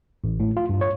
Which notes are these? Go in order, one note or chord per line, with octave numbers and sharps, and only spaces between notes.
A1
A2
F4
G2
C#5